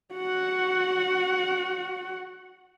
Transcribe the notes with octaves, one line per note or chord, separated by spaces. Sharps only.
F#4 F#5